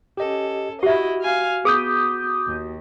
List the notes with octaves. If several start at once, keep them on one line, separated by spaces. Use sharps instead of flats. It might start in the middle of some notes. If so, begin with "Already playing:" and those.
C#4 G4 A4 D#5
E4 F#4 G4 D#5 E5
F5 G#5 F6
B3 G#4 D6 D#6 G6
D#2